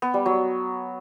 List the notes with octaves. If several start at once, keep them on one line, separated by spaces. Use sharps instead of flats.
B3
G3
F#3